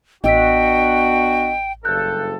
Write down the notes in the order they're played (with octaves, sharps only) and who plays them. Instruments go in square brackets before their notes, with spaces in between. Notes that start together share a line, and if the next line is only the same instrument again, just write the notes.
[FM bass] A1 [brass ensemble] B3 D4 F#4 [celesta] D#5 E6 B6 [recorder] G5
[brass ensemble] F#1 G2 A4 [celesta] F#6 G6